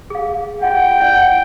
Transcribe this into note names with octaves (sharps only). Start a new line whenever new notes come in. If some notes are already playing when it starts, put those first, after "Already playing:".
G#4 F5
F4 D#5 F#5 G5
E4 D5 F#5